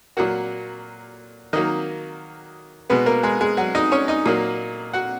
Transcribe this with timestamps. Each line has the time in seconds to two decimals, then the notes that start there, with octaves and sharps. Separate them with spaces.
0.17 A#2 F#3 A#3 F#4 F#5
1.53 D#3 F#3 A#3 D#4 D#5
2.90 B2 G#3 B3 B4
3.06 A#3 A#4
3.23 G#3 G#4
3.41 G#3 G#4
3.57 F#3 F#4
3.75 D#4 D#5
3.92 C#4 C#5
4.08 D#4 D#5
4.26 A#2 F#3 A#3
4.93 F#4 F#5